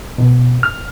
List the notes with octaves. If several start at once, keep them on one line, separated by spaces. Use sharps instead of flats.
B2
F6